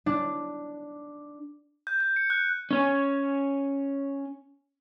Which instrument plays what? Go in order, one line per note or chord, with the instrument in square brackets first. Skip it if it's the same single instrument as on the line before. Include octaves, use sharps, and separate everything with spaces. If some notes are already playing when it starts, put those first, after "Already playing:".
[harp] D4
[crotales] G6
G6
C#7
F#6
[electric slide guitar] C#4 C#5